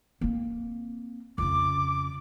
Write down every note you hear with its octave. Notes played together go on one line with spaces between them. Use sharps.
A#3 C4
F2 C#3 D6